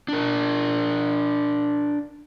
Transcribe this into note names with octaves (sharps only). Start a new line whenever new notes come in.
D4 A#4